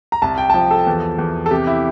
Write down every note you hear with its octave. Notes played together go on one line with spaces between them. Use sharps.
A#5
C2 A5
G5
A5
F3 G5
A4
E2
E2
A4
C3 G4
E4